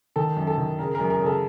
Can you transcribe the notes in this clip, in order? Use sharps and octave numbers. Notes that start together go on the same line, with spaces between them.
D#3 A4
F#2
A4
D#3
C#3 A#4
A#4
F#2
A#4
C#3
A4